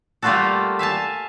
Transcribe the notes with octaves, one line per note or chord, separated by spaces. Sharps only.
G3 A3 A#3 F4 F#4 A4
E5 F5 G#5 A5